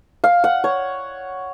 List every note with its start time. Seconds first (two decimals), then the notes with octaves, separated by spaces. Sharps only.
0.24 F5
0.44 F#5
0.64 C#5